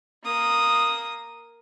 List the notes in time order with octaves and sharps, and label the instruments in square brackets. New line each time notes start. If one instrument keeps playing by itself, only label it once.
[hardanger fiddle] A#3 D#6